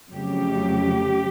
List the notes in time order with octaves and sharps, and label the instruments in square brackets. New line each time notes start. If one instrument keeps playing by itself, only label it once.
[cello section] F2 C#3 F#3 A3 G4